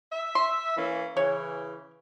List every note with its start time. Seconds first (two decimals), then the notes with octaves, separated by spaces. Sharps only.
0.12 E5
0.35 C6
0.77 E3 A#3 C#4
1.17 C#3 E3 C#5